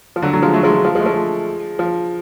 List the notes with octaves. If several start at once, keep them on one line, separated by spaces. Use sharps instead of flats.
F3
D3 F#3
D3 F#3
F3 G#3
F#3 A3
F3 G#3
F3
F3
F3 G#3
A3
F3 G#3
F3